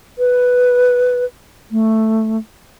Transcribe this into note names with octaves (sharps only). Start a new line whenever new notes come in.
B4
A3